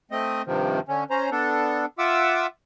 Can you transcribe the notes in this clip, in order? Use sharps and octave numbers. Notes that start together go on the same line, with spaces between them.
A3 C4 D#5
G2 C3 D#3 F3
D3 C#4
C#4 C5 A#5
B3 D4 A4
F4 E5 F#5 D6 E6